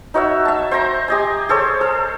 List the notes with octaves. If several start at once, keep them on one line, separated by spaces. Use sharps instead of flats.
D#4 F#4 C#5 E5
E5 A5
C5 G5 A#5 C#6
G4 D#5 G#5
G#4 A4 C5 C#5
A4